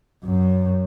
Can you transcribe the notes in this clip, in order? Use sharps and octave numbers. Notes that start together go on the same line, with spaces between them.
F#2